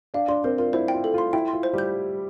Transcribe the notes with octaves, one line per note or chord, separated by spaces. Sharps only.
D4 D5 F5
D4 D5 C6
C4 A#4 C5
F4 A#4
E4 C5
G5
F4
A4
F4 C6
E4 G5
C6
F4
C5
G3 G4 G6